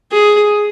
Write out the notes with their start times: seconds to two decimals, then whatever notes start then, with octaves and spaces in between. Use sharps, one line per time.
0.12 G#4